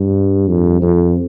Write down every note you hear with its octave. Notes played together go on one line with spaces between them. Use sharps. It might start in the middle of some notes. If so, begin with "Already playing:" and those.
Already playing: G2
F2
F2